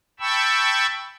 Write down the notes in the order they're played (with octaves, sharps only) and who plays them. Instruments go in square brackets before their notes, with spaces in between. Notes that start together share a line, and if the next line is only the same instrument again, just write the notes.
[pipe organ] G5 A5 B5 C#6 E6